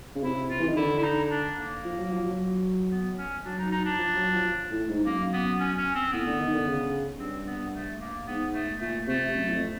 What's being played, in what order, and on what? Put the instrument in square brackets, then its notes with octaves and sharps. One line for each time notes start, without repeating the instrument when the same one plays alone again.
[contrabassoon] C#3
[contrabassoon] C3 [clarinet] E4
[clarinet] F4
[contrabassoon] E3
D#3
[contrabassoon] D3 [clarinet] E4
[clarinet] E4
D#4
D4
A#3
[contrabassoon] F3
F#3
F3
F#3
[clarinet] B3
C#4
[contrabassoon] F#3 [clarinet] D4
[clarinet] D#4
D#4
D4
[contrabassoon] F3
F#3
F3
A2
G#2
[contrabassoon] F#2 [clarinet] A#3
[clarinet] B3
C#4
C#4
C4
[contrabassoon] A2 [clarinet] B3
[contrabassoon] D3
D#3
D3
C#3
[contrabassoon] G2 [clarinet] C4
[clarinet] B3
A3
A#3
[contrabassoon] G#2 [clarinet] B3
[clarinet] A3
[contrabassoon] A#2 [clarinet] A3
[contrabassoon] C3 [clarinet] A3
[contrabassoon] F#2
E2
F2